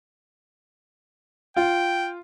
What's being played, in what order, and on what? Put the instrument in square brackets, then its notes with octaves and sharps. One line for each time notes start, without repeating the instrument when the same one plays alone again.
[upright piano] F4 [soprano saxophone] G5